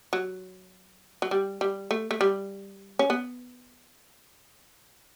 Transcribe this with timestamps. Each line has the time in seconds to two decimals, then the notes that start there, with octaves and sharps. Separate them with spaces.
0.13 F#3
1.22 F#3
1.31 G3
1.61 G3
1.91 A3
2.11 A3
2.21 G3
2.99 C#4
3.10 B3